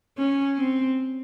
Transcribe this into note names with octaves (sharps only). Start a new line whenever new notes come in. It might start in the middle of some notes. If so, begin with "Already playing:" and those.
C#4
C4